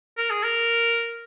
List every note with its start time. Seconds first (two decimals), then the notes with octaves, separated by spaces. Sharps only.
0.17 A#4
0.30 G#4
0.43 A#4